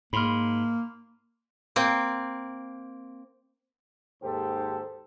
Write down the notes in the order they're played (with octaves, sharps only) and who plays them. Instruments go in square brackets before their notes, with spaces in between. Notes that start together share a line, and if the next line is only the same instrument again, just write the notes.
[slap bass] G#2 [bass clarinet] A#3 [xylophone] B5 C6 F6
[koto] A#3 C4
[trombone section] D#2 G#2 G4 A4 C5